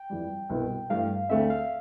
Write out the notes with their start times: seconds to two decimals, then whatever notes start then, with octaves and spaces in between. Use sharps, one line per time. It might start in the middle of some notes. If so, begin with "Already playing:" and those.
Already playing: G5
0.10 F2 E3 G3
0.50 C2 B2 B3 E4
0.90 G2 E3 A3 F5
1.29 D2 D3 A3 C4 E5
1.50 F5